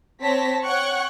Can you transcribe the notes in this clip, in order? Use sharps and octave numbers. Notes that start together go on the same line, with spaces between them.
C4 C#5 A5 A#6 B6
C#5 F#5 G5 C#6 F#6